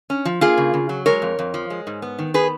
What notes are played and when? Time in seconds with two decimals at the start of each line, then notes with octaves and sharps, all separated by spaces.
0.10 C#4
0.25 F3
0.41 A#3 F4 G#4
0.58 C#3
0.74 C#3
0.89 F#3
1.06 G#3 A#4 C#5
1.22 F2
1.39 F2
1.54 F3
1.70 G#3
1.87 G#2
2.02 B3
2.19 D#3
2.34 B3 G#4 B4